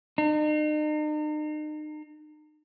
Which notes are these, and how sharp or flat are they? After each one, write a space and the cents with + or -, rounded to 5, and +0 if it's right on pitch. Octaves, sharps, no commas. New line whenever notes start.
D#4 -40